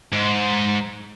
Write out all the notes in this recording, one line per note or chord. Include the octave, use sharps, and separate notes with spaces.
G#2